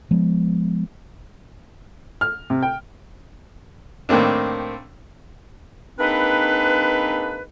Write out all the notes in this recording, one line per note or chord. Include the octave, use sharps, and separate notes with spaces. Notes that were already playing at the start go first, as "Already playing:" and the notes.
F3 G#3 B3
F6
C3
G5
A2 D#3 A#3 C4 D4
G#3 A#3 C4 D4 D#4 B4